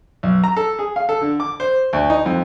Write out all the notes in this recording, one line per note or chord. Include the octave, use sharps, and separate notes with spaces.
B1
A#5
A4
G#4
F5
A4
D3
D6
C5
D2
D#4
F2